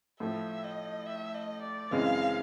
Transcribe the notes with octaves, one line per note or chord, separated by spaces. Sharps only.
A2 F3 A3 E5
D#5
E5
D#5
D5
F#2 C#3 E3 G#3 C4 F5